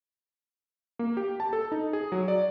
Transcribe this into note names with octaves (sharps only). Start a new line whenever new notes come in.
A#3
G4
A5
A4
D#4
G#4
F#3
D5